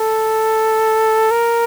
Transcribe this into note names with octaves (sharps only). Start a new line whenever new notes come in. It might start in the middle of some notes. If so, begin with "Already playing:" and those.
Already playing: A4
A#4